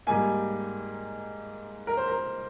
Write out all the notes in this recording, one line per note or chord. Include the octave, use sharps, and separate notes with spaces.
G#2 G3 A#3 G#5
A#4
C5
A#4